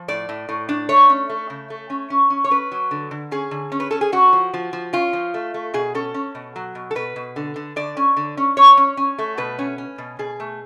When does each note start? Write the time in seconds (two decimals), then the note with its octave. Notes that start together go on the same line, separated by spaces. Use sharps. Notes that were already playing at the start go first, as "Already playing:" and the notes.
Already playing: F3
0.08 A2 D5
0.29 A2
0.49 A2
0.69 D4
0.89 A3 C#5
1.10 C#4
1.29 A3
1.50 C#3
1.70 A3
1.90 C#4
2.10 C#4
2.30 C#4
2.44 C#5
2.50 C#4 B4
2.72 F#3
2.91 D3
3.11 D3
3.31 C#4 G#4
3.51 D3
3.72 C#4
3.80 B4
3.91 C#4 A4
4.01 G#4
4.12 C#4 F#4
4.33 F3
4.54 F3
4.73 F3
4.93 C#4 F4
5.13 F3
5.34 A3
5.54 A3
5.74 B2 G#4
5.95 C#4 A4
6.14 C#4
6.35 B2
6.56 F#3
6.75 B2
6.91 A4
6.95 B2 B4
7.16 B2
7.36 D3
7.56 D3
7.76 D3 D5
7.97 C#4
8.17 D3
8.37 C#4
8.57 C#4 C#5
8.77 C#4
8.97 C#4
9.18 A3
9.37 B2 B4
9.59 C#4
9.78 C#4
9.98 B2
10.19 B2 G#4
10.40 A3